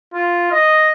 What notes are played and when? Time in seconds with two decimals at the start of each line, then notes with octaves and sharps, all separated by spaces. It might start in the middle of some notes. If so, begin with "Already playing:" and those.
0.14 F4
0.52 D#5